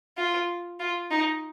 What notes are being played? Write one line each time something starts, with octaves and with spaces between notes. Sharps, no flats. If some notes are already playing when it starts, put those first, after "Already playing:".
F4
F4
D#4